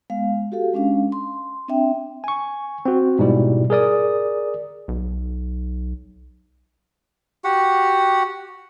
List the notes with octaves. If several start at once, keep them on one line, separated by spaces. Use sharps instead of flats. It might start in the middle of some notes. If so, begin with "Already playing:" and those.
G#3 B3 F5
F#4 G4 A4 F5
G#3 C#4 D4 F5
C6
C4 D4 E5 G5
G#5 C#6
C4 F#4
G#2 B2 G3 E4
G#4 A#4 D5 D#6
B1
F#4 G4 F#5